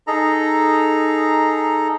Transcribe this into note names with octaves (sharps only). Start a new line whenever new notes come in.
D#4 G#4 A4 A#5